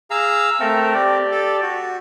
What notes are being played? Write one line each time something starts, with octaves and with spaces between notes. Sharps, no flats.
G#4 F5 A#5 E6
A3 C4 A4 A#4
G4 D5
A4
F#4